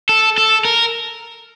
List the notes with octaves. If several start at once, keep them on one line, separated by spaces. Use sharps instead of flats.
A4
A4
A#4